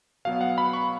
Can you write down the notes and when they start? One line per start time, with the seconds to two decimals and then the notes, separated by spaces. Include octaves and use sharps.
0.25 B2 F#3 B3 F5
0.41 F#5
0.58 B5
0.73 C#6